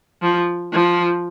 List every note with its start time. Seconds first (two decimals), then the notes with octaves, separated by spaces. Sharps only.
0.22 F3
0.73 F3